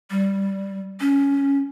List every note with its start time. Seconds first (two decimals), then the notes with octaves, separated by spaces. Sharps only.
0.11 G3
1.00 C#4